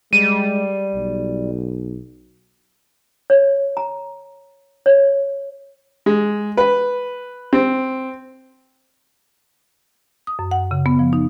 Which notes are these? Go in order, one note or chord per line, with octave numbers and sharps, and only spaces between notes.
G3 G#3 D#7
B1
C#5
A#5
C#5
G#3
B4
C4
D#6
F#2
F#5
C#3
B3
F3
D#4